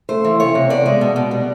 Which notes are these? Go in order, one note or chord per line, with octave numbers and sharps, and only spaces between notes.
A3 C5
E3
C3 C#5
C3
B3 D5
G#3
B2
B2
G3